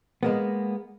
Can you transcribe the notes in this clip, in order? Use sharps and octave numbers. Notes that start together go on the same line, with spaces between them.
G#3 A#3 B3